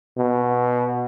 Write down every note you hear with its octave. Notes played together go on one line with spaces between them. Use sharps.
B2